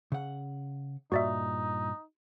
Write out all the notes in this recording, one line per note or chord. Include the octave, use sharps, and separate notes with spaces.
C#3 F#5
G2 A#2 D#4 F#4 D5 E5